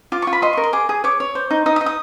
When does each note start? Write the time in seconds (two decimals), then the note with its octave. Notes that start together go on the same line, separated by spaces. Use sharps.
0.12 F4 D6
0.22 F4 C#6
0.33 B5
0.42 D#5 C6
0.53 A#4 C#6
0.64 C6
0.73 G#4 D6
0.89 G#4 D#6
1.04 C#5 D6
1.20 C#5
1.35 C5
1.51 D#4
1.66 D#4 D#6
1.76 D#6
1.81 D#4
1.86 D#6